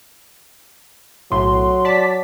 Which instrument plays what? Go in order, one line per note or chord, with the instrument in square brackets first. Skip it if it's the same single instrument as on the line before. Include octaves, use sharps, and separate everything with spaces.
[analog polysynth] B1 A2 [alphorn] F#3 [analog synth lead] C6
[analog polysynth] D5 A5 [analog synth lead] B6